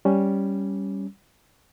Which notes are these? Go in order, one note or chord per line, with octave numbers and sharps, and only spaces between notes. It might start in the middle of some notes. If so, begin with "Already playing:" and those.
G3 C#4